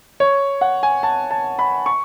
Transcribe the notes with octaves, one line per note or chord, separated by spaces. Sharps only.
C#5
F#5
G#5
A5
A5
B5
C#6